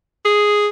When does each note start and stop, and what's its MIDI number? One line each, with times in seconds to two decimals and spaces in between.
0.25 0.67 68